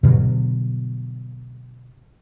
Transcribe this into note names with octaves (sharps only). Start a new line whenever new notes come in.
G2 B2 D3 F#3